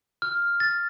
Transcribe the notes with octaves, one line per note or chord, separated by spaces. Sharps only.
F6
A6